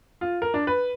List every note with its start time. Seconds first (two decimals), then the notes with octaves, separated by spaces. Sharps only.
0.21 F4
0.42 A#4
0.54 D4
0.67 B4